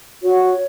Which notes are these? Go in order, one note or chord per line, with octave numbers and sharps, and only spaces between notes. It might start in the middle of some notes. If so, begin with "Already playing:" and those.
F#4 C#5